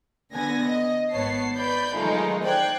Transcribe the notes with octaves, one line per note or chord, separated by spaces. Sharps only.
D3 B3 G#5 A#6
D#5
G#1 B3 C#5 A5 C7
B4 D5 B5 G6
D#3 F#3 G#3 A3 D#4 F4
C5 D5 G5 F#6 G#6